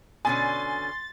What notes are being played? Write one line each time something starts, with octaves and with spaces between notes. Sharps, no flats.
B2 D3 C#4 G#5 C6 A6